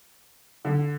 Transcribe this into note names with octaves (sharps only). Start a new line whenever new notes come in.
D3